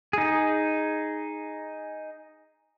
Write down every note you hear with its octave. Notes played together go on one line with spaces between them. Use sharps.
D#4 G#4